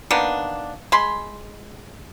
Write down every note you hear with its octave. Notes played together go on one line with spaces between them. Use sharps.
D#3 A#3 B3 D4
G#3 B5 C6